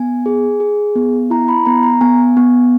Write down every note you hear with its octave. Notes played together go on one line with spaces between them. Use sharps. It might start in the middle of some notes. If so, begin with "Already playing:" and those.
Already playing: B3 G#5
G#4
G#4
B3
E4 A#5
B5
B3 A#5
A#5
B3 G#5
B3